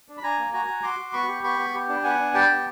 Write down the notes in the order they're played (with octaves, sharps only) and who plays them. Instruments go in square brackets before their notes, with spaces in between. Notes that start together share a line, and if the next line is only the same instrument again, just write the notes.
[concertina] D4
B5
D4 G#5 A#5
A#3
F#4 G#5 A#5
F#4
F#4 C6 D6
F#4
B3 B5 C#6
G4
B3 B5 C#6
B3
G4
D4
B3 F#5 G#5
D4
G4 G5 A5
B3